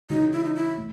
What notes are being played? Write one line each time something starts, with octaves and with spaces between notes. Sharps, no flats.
C#3 E3 G#3 C#4 D#4 F#4
E4
D#4
E4
A2